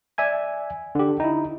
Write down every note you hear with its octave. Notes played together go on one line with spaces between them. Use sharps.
D5 E5 G#5 G#6
D3 G4
D#4 E4